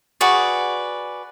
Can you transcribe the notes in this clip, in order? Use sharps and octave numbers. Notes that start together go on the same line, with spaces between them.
F#4 G#4 B4 D5